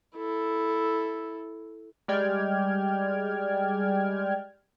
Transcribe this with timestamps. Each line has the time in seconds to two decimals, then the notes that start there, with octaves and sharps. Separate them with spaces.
0.17 E4 A4
2.08 G3 G#3 D5 G5 F6 G#6